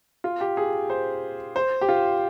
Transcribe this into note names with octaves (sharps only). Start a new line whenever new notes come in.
F4
G4
G#4
C5
C5
G4
F4